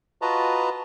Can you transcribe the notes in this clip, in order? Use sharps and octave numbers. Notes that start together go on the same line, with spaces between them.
F4 F#4 B4 D#5 A5 A#5